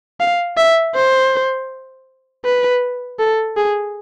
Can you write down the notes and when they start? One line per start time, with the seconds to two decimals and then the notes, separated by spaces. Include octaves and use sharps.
0.20 F5
0.57 E5
0.95 C5
2.45 B4
3.19 A4
3.56 G#4